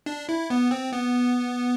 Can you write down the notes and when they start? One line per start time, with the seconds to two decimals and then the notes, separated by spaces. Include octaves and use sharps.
0.06 D4
0.29 E4
0.50 B3
0.71 C4
0.92 B3